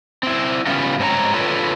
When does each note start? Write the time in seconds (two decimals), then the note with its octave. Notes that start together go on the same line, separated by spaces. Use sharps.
0.23 C4 E4
0.67 C#3 G3 B3 C#4 E4 F4
0.99 G#2 C4 A4 C#5 A#5
1.34 D3 F4 A4 B4 C#5